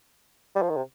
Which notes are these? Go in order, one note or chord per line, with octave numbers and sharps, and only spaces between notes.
G3
F3
D#3
C3